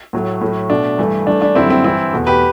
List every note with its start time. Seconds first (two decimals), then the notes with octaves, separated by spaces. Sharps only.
0.13 A2 F#3 A3
0.41 A2 F#3 A3
0.70 B2 A3 D4
0.98 G2 E3 A3
1.27 G2 E3 A3 D4
1.42 D4
1.55 F#2 D3 G3 C4 E4
1.70 C4
1.84 G2 E3 G3 C4 E4
2.13 E2 B2 A3
2.27 G4 B4